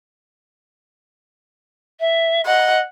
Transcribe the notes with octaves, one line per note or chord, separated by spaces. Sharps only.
E5
D#5 F#5